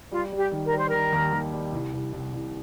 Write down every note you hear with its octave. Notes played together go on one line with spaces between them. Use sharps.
G3 F4
G3
G4
D#3
A#4
G3 C5
D#3 A#4
D#2
D#2
G3
C2
C2
C2
C2